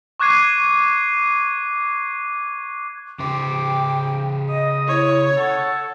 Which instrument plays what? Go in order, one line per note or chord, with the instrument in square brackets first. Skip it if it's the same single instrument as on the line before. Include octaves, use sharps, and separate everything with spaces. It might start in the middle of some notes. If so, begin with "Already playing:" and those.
[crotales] C#6 D6 F#6 G#6 C7 D#7
[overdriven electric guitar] C#3 C5 [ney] G5 [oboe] D6
[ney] D#5 [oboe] D#6
[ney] E4 [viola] C#5
[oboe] A4 [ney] F#5